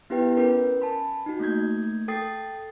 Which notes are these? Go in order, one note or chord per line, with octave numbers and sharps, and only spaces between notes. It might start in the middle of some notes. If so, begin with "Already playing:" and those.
B3 E4 G4 B4 G5
C#4 A#4 B4
G#5 A5 B5
D#4 F#4
A3 A#3 G6 G#6
A4 G5 D#6 A6 C7